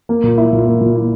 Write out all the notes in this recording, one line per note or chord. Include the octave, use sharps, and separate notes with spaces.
A#3
A#2
E4
A#2
A#3
A#2
E4